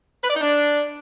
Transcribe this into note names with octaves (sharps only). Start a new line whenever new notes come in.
B4
D5
D#4
D4